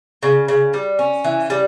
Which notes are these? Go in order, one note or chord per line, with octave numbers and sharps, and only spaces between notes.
C#3
C#3
G3
C#4
E3
G3